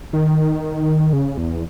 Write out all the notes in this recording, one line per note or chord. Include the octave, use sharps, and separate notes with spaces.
D#3
C#3
E2